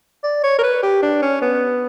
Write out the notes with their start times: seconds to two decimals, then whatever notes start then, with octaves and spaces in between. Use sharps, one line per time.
0.24 D5
0.44 C#5
0.58 A#4
0.63 B4
0.83 G4
1.03 D4
1.22 C#4
1.42 B3